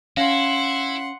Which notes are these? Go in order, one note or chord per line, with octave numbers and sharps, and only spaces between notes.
C#4 E4 F5 F#5 C6